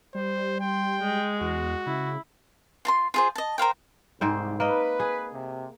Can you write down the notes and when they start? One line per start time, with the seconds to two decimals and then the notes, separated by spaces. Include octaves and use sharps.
0.15 G3 C5
0.61 G5 C6
1.02 G#3
1.41 E2 F#4
1.86 C#3 E4
2.85 F4 A5 C6
3.14 F4 G#4 C5
3.36 D#5 A5
3.58 A#4 C5 F5 G5
4.21 C2 G#2 C4 C5
4.60 A#3 B4 D#5
5.00 G#4
5.33 C3